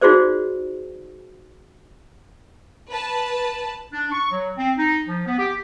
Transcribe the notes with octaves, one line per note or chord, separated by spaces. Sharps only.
D#4 F4 F#4 G#4 C5 D5
B4 A5
D4
C#6
F#3
C4
D#4
F3
B3
G4